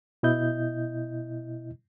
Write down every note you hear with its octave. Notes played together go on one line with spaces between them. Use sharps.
B2 E4 D#5 G6